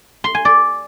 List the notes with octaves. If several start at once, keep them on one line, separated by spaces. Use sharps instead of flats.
C6
G#5
D5